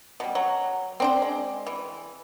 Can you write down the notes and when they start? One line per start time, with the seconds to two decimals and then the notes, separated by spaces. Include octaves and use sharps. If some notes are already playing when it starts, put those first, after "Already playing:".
0.20 B2 G3
0.35 F#3
1.00 C4 D4 C5
1.22 G#3
1.67 E3